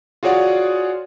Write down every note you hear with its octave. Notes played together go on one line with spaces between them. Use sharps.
F4 F#4 G#4 C#5 D5 F#5